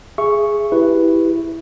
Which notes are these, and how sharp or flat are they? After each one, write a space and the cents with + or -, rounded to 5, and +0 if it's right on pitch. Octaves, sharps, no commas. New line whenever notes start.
G#4 +0 E5 +25 C#6 +0
E4 +0 G4 +0 B4 +0